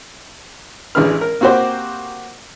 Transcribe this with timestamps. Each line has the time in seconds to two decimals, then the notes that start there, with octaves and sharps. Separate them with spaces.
0.95 A1 E3 G#3 D4 B4 F6
1.21 A#4
1.41 A#3 C4 F#4 G4 C5